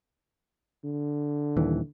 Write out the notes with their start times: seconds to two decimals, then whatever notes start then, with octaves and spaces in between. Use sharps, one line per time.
0.85 D3
1.57 D#1 D#2 E3